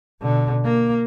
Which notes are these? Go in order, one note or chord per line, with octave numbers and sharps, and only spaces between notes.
B2 D3
A#3